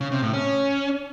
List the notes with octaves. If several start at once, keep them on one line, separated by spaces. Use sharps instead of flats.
C#3
C3
A2
C#4